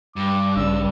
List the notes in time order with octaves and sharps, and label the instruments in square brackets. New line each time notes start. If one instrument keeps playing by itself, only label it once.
[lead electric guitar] G2 [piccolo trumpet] D6
[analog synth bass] A#1 [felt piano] C#3 D5 [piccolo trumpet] E6